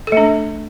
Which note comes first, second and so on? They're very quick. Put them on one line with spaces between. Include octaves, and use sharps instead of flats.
A4 A3 D4